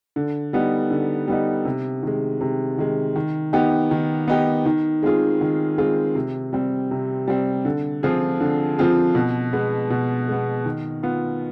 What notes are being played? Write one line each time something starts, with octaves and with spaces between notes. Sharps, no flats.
D3
G3 B3 D#4
D3
G3 B3 D#4
C3
D#3 G#3
C3
D#3 G#3
D#3
B3 D#4 G4
D#3
B3 D#4 G4
D#3
G#3 C4 F4 G#4
D#3
G#3 C4 F4 G#4
C3
G3 C4
C3
G3 C4
D3
F3 C4 F4 G#4
D3
F3 C4 F4 G#4
B2
G#3 B3
B2
G#3 B3
D#3
B3 F4